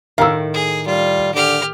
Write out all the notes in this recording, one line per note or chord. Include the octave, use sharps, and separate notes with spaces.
A2 D#3 F5 A#5 E6
G#4
G3 F4
D3 G4 F6